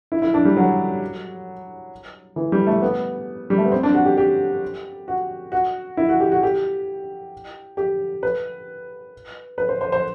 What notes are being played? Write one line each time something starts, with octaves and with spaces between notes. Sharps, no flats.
E4
E4
D4
G3
F#3
E3
G3
A3
B3
G3
A3
B3
C4
D4
F#4
G4
G4
F#4
F#4
E4
F#4
G4
F#4
G4
G4
B4
B4
C5
C5
C5